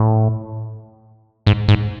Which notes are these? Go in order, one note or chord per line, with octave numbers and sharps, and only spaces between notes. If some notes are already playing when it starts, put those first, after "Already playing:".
Already playing: A2
G#2
G#2